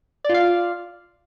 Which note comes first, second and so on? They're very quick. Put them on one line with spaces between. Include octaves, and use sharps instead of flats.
D5 F4 F5